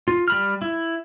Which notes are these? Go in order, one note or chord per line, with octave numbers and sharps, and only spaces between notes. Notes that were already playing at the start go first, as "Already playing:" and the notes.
F4
G3 B5 F6
E4